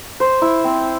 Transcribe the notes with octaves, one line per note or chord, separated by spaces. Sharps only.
C5
E4
C4